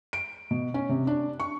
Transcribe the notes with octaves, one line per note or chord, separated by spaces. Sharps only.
D7
B2
C#4
C3
D4
C#6